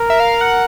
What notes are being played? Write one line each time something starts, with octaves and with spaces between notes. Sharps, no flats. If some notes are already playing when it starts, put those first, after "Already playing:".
Already playing: A#4
E5
F5
F#5